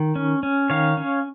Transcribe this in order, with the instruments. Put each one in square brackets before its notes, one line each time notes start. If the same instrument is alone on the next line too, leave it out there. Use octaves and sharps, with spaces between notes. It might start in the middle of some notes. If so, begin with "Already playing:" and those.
Already playing: [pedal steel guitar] D#3
C#4
C#4
D#3 C#5 F5
C#4